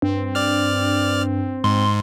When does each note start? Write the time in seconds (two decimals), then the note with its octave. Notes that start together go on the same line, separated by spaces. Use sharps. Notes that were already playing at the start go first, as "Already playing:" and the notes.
0.02 G2 C4
0.35 D5 F6
1.64 G#2 C6